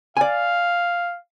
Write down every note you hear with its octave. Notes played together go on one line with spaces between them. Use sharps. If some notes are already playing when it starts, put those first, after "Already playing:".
D5 F5 G#5